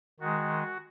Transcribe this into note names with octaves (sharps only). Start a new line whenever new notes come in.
D#3 G#3 F#4